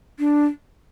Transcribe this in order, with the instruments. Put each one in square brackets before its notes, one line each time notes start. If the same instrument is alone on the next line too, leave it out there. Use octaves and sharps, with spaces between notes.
[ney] D4